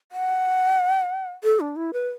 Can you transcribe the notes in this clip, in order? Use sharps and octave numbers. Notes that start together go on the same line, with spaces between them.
F#5
A4
D4
E4
B4